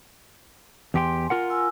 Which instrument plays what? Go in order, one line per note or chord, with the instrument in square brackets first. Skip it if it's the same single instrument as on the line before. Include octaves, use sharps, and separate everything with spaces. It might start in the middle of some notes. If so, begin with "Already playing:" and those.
[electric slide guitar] E2 G4 G5 [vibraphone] G#5 C6
[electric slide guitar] F4 A#4 F#5
[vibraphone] G#5 E6